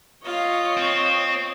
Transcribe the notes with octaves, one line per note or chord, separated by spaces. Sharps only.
F4 C#5 D#5 F5
C4